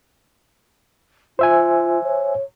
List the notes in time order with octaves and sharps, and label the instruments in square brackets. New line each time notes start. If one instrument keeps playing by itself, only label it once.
[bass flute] F4 [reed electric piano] C5 E5 G#5
[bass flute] C#5